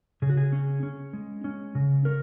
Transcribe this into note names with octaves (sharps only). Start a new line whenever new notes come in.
C#3 G#4
F#4
G#4
C#4
C#4
G#3
C#4
C#3
C#4 A#4